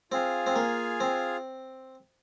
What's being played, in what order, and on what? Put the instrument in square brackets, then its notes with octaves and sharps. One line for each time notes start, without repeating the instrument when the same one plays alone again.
[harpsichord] C4 [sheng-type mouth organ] F4 G#4 F5 G#5
[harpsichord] C4
A#3
C4